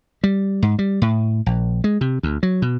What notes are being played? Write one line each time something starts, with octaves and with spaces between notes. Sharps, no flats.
G3
G#2
G3
A2
A#1
G#3
C3
D2
F#3
B2